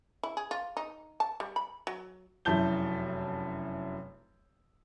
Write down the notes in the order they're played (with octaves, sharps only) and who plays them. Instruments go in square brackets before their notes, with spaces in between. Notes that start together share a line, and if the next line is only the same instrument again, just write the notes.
[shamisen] E4
G#4
F4
D#4
A5
G3
B5
F#3
[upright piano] F1 F#2 E4 A5 G6 G7